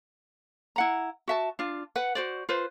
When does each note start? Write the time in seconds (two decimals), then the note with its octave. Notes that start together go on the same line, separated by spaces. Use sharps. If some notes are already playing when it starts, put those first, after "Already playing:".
0.76 E4 F#5 A#5
1.28 F#4 E5 A5
1.59 D4 F4
1.96 B4 F#5
2.15 F#4 C5 D5
2.49 F4 B4 C5